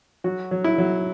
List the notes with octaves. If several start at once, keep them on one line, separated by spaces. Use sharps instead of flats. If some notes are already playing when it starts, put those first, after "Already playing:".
F#3 F#4
F#3
E4
F#3